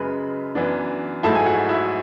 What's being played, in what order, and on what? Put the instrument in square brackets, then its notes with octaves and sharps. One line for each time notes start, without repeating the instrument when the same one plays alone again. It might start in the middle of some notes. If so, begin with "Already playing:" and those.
Already playing: [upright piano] F#2 C#3 G#3 B4 B5
F#2 E3 B3 D4
G#2 F#3 A3 E4 A4 A5
G#5
F#4 F#5
E4 E5